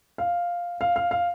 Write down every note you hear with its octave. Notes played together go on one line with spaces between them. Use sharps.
F5
F5
F5
F5